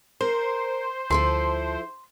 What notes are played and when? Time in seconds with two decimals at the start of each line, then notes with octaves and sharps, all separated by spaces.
0.21 A#4 C5
1.10 D2 F3 E4 A4 C6